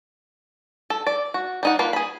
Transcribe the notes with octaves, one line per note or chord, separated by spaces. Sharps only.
A4
D5
F#4
G3 D#4 F#5
A#3 F4 B4 F5
G#4 B5